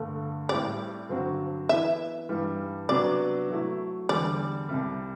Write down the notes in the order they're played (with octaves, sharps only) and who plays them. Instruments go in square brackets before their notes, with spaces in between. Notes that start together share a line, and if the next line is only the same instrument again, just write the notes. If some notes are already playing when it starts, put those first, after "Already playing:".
Already playing: [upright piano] G2 D3 A3
[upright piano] A2 G3 C4 G4 [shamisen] D5
[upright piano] G2 D3 F#3 C4 F#4
[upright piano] E3 B3 E4 [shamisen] E5
[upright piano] G2 E3 G3
[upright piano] C3 F#3 B3 D4 [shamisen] D5
[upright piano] F#3 A3 E4
[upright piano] E2 D3 G3 [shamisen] D5
[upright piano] C2 C3 G3